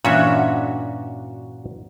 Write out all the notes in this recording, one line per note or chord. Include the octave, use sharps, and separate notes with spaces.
G2 A#2 E3 C#4 F#4 E5